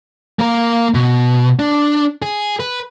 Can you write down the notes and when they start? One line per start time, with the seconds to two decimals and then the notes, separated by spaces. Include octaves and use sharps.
0.39 A#3 A#4
0.94 B2
1.59 D4
2.22 G#4
2.60 B4